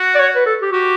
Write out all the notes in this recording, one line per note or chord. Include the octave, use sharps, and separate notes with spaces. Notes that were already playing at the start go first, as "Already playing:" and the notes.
Already playing: F#4
D5
C#5
B4
A4
G4
F#4 G4